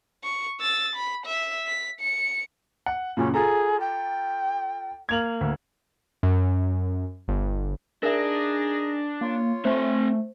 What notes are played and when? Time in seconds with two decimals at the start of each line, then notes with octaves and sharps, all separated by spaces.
0.23 C#6
0.60 E6 A6
0.95 B5
1.26 E5
1.66 B6
2.00 C#7
2.86 F#5
3.17 F#2 A#2 C#3 C#4
3.34 F4 G#4 A4 A#5
3.80 G5
5.09 A#3 G#6 F7 F#7
5.41 D2
6.23 F#2
7.28 G1
8.03 D4 D#4 G#4 A#4 E5 A#6
9.21 A#3 F4 C#5
9.65 A3 C4 C5 G#5